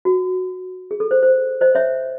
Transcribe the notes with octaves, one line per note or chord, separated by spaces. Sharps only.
F#4
G#4
A4
C5
C5
C5 D#5
C#5 E5